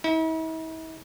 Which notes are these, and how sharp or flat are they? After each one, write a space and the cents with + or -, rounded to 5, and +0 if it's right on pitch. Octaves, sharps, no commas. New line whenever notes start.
E4 -45